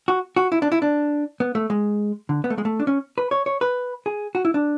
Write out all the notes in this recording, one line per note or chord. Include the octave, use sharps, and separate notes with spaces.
F#4
F#4
E4
D4
E4
D4
B3
A3
G#3
D3
B3
A3
G#3
A3
D4
C#4
B4
C#5
C#5
B4
G#4
F#4
E4
D4